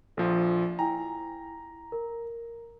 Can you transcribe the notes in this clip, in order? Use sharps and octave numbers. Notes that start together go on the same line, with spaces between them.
A#1 F3 A4
E4 G5 G#5 A#5
A#4